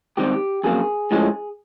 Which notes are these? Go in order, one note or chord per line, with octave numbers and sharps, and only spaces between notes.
G#2 D#3 G3 C4 G4
F2 C#3 F#3 A#3 G#4
A2 F3 G#3 C#4